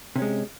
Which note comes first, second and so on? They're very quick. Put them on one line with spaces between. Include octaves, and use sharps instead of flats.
C3 C#4 G#3